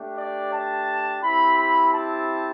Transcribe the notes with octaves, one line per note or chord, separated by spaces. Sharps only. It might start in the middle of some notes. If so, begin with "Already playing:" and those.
Already playing: A3 D4 G4
D5
A5
C4 E4 G4 B5
B5
A5